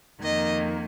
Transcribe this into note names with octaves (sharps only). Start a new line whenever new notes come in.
F2 D#3 A#3 D#5